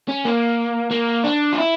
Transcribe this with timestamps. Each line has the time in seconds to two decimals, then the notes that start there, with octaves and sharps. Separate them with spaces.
0.08 C#4
0.25 A#3
0.91 A#3
1.24 D4
1.52 F4
1.58 E4